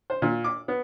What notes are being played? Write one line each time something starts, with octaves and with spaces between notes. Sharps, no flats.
C5
A#2
D6
B3